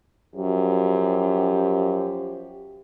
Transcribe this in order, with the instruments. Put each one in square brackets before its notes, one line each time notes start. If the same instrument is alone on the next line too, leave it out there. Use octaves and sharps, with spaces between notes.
[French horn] F#2 [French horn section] F3 F#3 G4